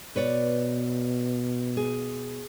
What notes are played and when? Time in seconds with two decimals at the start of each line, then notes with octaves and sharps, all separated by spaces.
0.16 B2 B4 C#5 D5
1.77 G#4